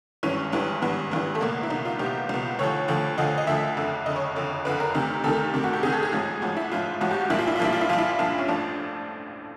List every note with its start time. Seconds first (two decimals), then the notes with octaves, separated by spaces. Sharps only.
0.23 G#1 G2 E3 C#4
0.52 G#1 G2 E3
0.82 G#1 G2 E3 B3
1.11 G#1 G2 E3
1.35 A3
1.41 C#2 B2 A#3
1.63 E4
1.70 C#2 B2 D#4
1.85 F4
1.99 C#2 B2 G4
2.29 C#2 B2
2.59 D2 D3 F3 C#5
2.88 D2 D3 F3
3.18 D2 D3 F3 D#5
3.38 D#5
3.47 D2 D3 F3 E5
3.77 F#1 F2 D3
4.06 F#1 F2 D3 D#5
4.16 C#5
4.36 F#1 F2 D3
4.65 F#1 F2 D3 B4
4.80 A#4
4.95 D2 C3 D#3
5.24 D2 C3 D#3 A4
5.54 D2 C3 D#3
5.64 F#4
5.73 G4
5.83 D2 C3 D#3 G#4
5.93 A4
6.03 G#4
6.12 A1 G#2 F3
6.42 A1 G#2 F3 F#4
6.57 E4
6.71 A1 G#2 F3 F4
7.01 A1 G#2 F3 F#4
7.11 G4
7.21 F#4
7.30 C2 A#2 F3 E4
7.39 F4
7.47 E4
7.56 F4
7.59 C2 A#2 F3 E4
7.73 F4
7.81 E4
7.89 C2 A#2 F3 F4
7.98 E4
8.19 C2 A#2 F3 D4
8.38 C#4
8.48 A#1 A2 F3 D4